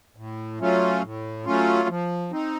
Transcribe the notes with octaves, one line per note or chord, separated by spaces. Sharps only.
A2
F#3 A3 C#4 F4
A2
F#3 A3 C#4 F4
F3
C4 D#4